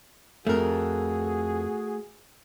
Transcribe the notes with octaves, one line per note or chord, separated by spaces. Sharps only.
F2 A3 F#4 G#4 A#4